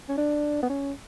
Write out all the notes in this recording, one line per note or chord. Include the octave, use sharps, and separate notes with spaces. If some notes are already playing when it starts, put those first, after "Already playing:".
C#4
D4
B3
C#4